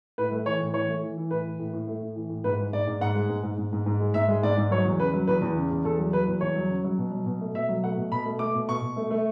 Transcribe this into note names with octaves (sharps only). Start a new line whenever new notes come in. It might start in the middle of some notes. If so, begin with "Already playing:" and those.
A2 B4
A3
E3 C#5
A2
E3 C#5
A3
E3
E3
A2 B4
E3
A2
A2
A3
A2
E3
A2
G#2 B4
G#3
G#2 D5
G#2
G#2 F#5
G#3
G#2
G#2
G#2
G#2
G#2
G#3
G#2 E5
G#3
G#2 D5
G#2
F#3 C#5
E2
C#3 B4
F#3
E2 B4
E2
C#3
E2
E2 A4
F#3
F#3 B4
E2
E2 C#5
F#3
C#3
F#3
B2
F#3
B2
A3
B2 E5
F#3
A3 F#5
B2
B2 B5
A3
A3 D6
B2
B2 C#6
B2
A3
A3